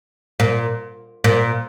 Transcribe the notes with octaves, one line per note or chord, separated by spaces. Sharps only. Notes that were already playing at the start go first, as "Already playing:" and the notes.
A#2
A#2